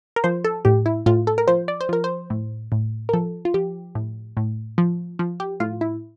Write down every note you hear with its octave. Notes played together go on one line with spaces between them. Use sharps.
A#4
F3 C5
A4
A2 G4
E4
A2 F4
A4
A#4
F3 C5
D5
C5
F3 A#4
C5
A2
A2
A#4
F3 A4
F4
F3 G4
A2
A2
F3
F3
G4
A2 F4
E4